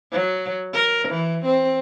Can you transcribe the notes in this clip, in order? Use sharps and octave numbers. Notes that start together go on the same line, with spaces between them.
F#3
A#4
E3
C4